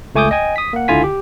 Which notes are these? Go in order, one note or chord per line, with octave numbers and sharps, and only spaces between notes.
C#2 A3 G#5 D6 D#6 G6
D#5 G5 G#5
D#6 B6
A#3 F#5
C#2 D3 E4 F4 G#5 B6
G4